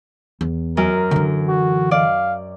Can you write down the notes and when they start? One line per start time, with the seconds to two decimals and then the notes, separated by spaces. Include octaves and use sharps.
0.41 E2
0.77 F#2 A#4
1.11 D3 E3
1.48 F#4
1.91 D5 F5